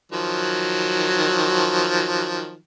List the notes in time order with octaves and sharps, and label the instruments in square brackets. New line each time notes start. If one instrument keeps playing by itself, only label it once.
[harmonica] D#3 F3 F#3